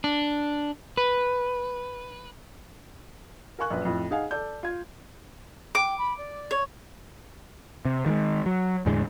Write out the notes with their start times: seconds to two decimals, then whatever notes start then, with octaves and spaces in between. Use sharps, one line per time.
0.04 D4
0.97 B4
3.59 A#4 F5 G#5 C#6 F#6
3.71 A#1 F#2 B4
3.85 F2 A2
4.11 D#4 G#4 D#5 F5 F#5 G#5
4.31 A4 D5 G6
4.63 F4 F5 G#6
5.75 G5 D6
5.98 B5
6.17 D5
6.51 C#5
7.85 C3
8.06 D#3 F3 G#3
8.46 F#3
8.86 E2 A2 D3 G#3